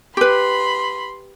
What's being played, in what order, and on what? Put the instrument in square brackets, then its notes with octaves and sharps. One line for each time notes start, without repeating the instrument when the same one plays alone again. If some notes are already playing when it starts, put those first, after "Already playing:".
[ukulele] G4 B4 [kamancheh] B5 C6